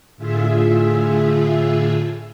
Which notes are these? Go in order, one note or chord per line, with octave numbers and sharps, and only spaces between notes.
A2 D3 F4 G#4 E5